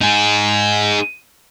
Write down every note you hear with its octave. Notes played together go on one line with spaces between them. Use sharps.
D#4 G#4